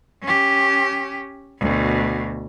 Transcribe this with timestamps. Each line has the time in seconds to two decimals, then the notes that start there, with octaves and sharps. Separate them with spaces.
0.23 C#4 G4
1.59 D2 B2